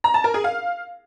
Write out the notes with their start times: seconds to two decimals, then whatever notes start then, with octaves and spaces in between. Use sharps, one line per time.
0.04 A#5
0.14 A5
0.24 A#4
0.34 G#4
0.44 F5